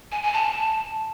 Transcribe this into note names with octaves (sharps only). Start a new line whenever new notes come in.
G#5
G#5
A5